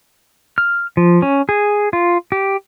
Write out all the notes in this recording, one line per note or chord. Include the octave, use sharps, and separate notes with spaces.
F6
F3
C#4
G#4
F4
G4